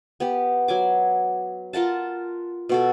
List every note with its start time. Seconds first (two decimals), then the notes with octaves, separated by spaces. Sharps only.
0.20 B3 G4
0.68 F#3 G#5 D6
1.73 F4 A#4 F#5 A5
2.69 B2 F#4 A4